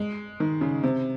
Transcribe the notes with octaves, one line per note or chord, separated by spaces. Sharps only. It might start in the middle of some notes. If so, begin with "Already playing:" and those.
Already playing: G#3
D#3
C#3
C3